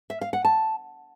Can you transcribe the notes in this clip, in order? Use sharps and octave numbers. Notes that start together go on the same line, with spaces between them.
E5
F5
F#5
A5